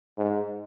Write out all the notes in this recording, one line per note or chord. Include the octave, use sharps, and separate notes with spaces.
G#2